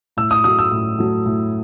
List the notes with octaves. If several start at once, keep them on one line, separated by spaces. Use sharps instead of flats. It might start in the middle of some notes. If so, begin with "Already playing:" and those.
A2 E6
D#6
F#3 A3 D#6
E6
A2
F#3 A3
A2